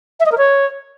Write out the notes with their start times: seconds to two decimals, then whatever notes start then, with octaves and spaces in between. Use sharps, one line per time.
0.20 E5
0.26 D#5
0.32 A#4
0.38 C#5